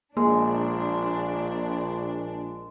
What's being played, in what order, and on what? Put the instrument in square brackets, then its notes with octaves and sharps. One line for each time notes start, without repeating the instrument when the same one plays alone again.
[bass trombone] A#1 [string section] A#2 D4 [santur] G#3 [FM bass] A#3